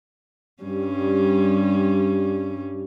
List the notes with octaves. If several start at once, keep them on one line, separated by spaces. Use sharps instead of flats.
G2 G3 C#4